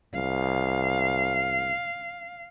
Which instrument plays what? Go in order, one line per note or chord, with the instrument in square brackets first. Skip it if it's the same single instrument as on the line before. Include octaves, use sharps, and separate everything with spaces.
[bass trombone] C2 [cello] F5